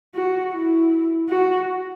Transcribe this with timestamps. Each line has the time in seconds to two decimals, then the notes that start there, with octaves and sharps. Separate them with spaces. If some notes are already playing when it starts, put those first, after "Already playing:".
0.14 F#4
0.53 E4
1.29 F#4